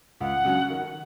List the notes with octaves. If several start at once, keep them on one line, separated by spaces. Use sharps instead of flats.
C#2 F#5
C#3 F#3 C#4
D#3